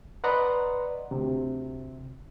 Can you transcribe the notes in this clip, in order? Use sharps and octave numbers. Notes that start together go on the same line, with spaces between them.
B4 D5 D#5 F#5 A#5 C6
D2 C3